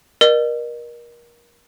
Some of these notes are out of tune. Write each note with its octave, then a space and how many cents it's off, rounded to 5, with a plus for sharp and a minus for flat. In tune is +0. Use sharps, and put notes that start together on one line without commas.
A#4 +30 D#5 -40